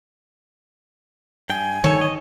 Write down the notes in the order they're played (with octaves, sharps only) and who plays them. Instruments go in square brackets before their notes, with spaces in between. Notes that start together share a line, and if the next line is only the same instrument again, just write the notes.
[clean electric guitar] G2 G5 [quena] G#5
[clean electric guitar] G2 A3 A4 [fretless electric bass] D#3 [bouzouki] C#5
[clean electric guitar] D#5